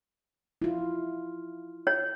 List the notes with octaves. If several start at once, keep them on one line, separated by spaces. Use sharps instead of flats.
E4 F4
C#5